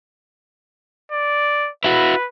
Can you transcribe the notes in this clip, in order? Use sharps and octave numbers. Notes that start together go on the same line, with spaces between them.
D5
E4 F#4 B4